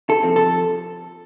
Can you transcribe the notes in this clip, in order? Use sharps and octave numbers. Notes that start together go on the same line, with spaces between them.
A4
F3 C4
A4